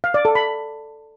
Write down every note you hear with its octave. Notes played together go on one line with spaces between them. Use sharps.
F5
D5
A4
B5